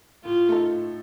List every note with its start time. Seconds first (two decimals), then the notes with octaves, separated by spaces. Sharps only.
0.24 A2 F4
0.48 A3 D#4 A4
0.72 A2